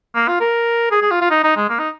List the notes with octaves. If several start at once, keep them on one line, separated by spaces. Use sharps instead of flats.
A#3
F4
A#4
G#4
G#4
F4
F4
D#4
D#4
G#3
A#3
D#4